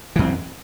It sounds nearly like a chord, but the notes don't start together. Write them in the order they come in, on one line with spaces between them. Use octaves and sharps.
E3 F#2 C4